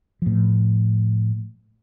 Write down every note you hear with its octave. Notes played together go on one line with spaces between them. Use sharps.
A2 F3